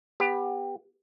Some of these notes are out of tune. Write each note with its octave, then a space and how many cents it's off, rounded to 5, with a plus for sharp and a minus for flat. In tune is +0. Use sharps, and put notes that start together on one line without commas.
B3 +0 G4 +20